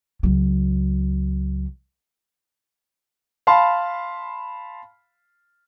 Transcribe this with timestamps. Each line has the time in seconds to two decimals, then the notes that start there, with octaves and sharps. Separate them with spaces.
0.23 C#2 F#3
3.47 F5 A5 B5 C6